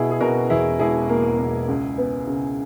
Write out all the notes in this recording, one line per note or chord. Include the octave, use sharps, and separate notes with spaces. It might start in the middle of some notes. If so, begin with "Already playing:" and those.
Already playing: B2 E4 G#4
G#4
B2 F#4 A#4
E2 E4 G#4
E1 E4 G#4
A#3
A#3
C#2
B3
C#3